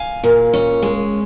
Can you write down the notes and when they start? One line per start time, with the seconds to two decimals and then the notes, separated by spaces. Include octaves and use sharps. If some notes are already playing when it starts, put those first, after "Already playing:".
Already playing: F5 G#5
0.24 A#2
0.53 C#4
0.82 G#3